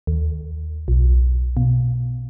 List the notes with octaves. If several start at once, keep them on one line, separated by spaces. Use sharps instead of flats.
D#2
B1
B2